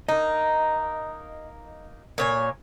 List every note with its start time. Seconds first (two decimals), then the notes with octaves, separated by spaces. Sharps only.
0.08 A#3 D#4 D#5
2.18 A#2 C#5 G#5